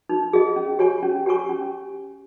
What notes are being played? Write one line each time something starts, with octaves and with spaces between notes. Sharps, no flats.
D#4
G#4 D#5
C#4
G4 C#5 G#5 C#6
C#4
G4 C#5 G#5 C#6
C#4